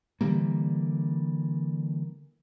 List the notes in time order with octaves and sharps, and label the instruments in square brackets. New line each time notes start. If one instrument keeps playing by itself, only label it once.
[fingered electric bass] D3 E3 G3 A#3